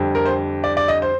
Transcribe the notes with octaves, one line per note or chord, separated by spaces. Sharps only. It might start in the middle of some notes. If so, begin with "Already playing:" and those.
Already playing: F2 D3 G3
A#4
C5
D5
D5
D#5
C5